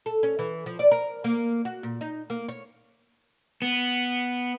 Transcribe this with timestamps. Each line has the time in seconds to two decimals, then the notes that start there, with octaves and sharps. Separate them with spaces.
0.06 A4
0.23 C#4
0.39 E3
0.66 F3
0.79 D5
0.91 A#4
1.24 A#3
1.65 F#4
1.83 A#2
2.01 D#4
2.30 A#3
2.49 C#5
3.62 B3